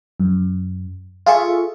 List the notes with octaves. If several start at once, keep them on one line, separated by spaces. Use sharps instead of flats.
F#2
F4 G#4 A4 E5 C#6